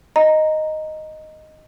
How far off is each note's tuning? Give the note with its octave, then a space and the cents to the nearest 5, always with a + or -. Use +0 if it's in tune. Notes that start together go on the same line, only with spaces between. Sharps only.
D#5 +0 A#5 +0